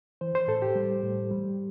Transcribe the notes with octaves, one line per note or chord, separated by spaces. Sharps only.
E3 C5
C5
A2 A4
G4
G3
A2
G3